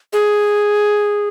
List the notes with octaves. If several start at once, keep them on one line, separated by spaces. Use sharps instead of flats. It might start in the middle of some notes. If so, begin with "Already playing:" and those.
G#4